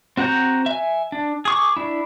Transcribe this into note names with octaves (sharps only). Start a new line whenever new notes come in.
C4 F#4 F#5 A#5 G6
E5 G#5
D4
G#4 C#6 D6
D4 E4